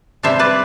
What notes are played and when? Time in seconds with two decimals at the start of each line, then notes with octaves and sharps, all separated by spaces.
0.23 C3 G3 D4 C5 E5
0.39 B4 D5